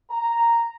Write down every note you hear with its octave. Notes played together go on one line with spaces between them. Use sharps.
A#5